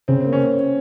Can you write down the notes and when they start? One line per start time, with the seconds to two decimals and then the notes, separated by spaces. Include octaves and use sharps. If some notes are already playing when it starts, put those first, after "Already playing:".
0.08 C#3 C4
0.20 A#3 C4
0.33 C#4